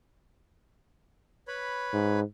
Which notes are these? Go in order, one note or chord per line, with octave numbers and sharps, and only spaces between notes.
B4 C#5 B5
G#2